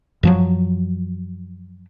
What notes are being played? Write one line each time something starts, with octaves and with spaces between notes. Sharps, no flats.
F#2 F3 F#3